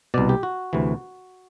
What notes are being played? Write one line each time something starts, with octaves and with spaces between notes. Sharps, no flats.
C2 B2 D5
G4
F#4
D2 C3 E3